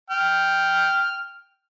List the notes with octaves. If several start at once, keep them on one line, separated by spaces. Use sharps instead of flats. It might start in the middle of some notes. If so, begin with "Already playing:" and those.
G5 F6